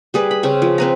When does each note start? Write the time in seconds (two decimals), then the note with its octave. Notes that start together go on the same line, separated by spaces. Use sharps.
0.14 G3 G#4 B4
0.31 B5
0.43 C#3 C4 C#4
0.62 F3 B4
0.78 C4 B4 A#5